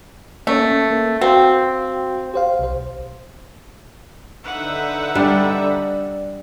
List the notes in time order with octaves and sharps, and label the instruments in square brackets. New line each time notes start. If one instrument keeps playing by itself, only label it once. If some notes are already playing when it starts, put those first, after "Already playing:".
[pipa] A3 [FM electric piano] A#3 C#4
[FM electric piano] A#3
[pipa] C4 [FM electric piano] F#4 F5 G5
[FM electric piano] G4 C5 F5
B1 C5
[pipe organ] D3 D#4 E5 [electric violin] B4 F#5
[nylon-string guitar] G3 [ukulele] D4